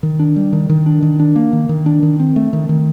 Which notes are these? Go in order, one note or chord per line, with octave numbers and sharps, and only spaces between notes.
D#3
D4
G3
D#3
D#3
D4
D#3
D4
A#3
D#3
D#3
D4
D#3
C4
A3
D#3
D#3